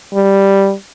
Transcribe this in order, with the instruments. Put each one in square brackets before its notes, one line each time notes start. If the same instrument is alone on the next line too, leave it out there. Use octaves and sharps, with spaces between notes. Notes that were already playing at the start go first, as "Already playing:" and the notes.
[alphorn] G3